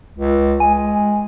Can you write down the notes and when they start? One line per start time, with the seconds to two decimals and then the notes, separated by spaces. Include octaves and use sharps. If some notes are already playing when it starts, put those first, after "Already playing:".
0.15 C#2
0.60 G#3 G#5